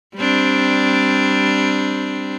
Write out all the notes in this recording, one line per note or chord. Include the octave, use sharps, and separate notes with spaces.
G3 C4 D4